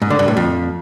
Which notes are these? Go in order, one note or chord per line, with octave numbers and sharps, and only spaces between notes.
G#2
D3
G2
A2
F2